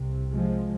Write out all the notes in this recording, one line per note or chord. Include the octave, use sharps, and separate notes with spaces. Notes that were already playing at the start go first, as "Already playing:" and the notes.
Already playing: C2 C3
F3 G#3